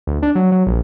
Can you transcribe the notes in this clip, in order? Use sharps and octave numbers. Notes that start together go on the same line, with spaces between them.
D2
D4
F#3
F#3
A#1